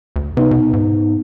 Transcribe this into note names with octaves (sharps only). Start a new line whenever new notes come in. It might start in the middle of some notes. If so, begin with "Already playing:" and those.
D2
C3 B3 D#4
B2
G#2